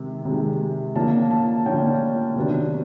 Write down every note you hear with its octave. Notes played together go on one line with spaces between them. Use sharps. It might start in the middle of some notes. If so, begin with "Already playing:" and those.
Already playing: C3 D#3 G#3
C3 D#3 G#3
D3 F3 A#3 C#4 A5
A5
D3 F3 A#3 C#4 G5
C3 D#3 F#3 B3 D4